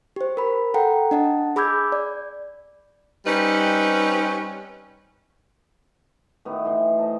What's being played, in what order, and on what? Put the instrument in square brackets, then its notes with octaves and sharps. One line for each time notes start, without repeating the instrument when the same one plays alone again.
[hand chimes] G4 C5
A#4 B5
A4 F#5 G5 A#5
D4 D#5 F#5 A5
G#4 B5 D6 E6 G6 G#6
D5
[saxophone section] G3 C4 C#4 D#4 B4
[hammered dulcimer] A2 D#3 B3 F#4
A2 E3 G5 C6
A4 C5 D#5